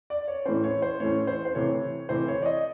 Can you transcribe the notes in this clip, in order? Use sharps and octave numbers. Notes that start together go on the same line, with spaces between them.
D5
C#5
A2 E3 A3 C#4 C5
C#5
C5
A2 E3 A3 C#4 C#5
C5
C5
C3 E3 A3 C#5
C3 E3 A3 C5
C#5
D5
D#5